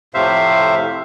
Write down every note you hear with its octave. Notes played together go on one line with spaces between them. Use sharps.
F2 A2 C3 C5 E5 F5